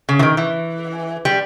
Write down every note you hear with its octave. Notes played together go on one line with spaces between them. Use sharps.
C#3
E3
D#3
E3
G3